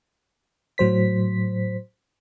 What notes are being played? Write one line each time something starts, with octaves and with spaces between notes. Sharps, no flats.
A2 F#3 C5 B6